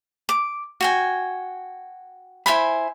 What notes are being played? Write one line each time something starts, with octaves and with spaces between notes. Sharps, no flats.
D6
F#4 G5 G#5
E4 C5 G#5 B5